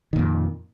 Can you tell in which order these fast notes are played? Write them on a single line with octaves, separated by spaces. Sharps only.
D#3 A#2 F2